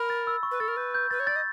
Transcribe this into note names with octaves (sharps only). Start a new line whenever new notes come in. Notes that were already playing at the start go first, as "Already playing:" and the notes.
Already playing: A#4 B5
A6
E6
C#6
B4
A4 A6
A#4
B4 G6
G6
B4 A6
C#5
D5 A6
D#5